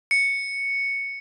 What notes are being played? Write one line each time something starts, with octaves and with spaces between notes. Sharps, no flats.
C#7